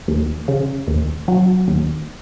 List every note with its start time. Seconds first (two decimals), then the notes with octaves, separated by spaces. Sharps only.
0.08 D#2
0.48 C#3
0.88 D#2
1.28 F#3
1.68 D#2